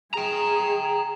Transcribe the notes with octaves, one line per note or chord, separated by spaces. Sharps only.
G#4 G5 A#5